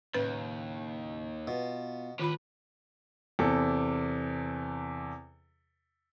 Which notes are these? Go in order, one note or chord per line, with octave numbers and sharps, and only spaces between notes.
D#2 A2 C#3 C#4 B4
B2 B3 F4
A2 D#3 F4 B4 B5
E2 C3 A4